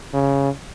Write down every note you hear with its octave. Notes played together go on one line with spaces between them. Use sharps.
C#3